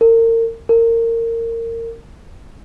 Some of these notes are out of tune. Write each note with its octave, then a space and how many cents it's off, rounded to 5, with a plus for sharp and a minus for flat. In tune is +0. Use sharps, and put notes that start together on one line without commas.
A#4 -35
A#4 -25